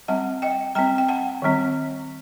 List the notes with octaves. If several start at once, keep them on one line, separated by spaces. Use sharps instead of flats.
G3 C4 F#5 A5
D#5 G5
G3 C4 G5 A#5
G5
F#5 A5
D#3 G3 C4